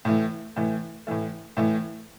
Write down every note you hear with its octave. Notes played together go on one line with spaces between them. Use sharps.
A2 E3 A3
A2 E3 A3
A2 E3 A3
A2 E3 A3